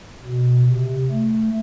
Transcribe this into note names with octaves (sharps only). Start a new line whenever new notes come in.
B2
C3
A3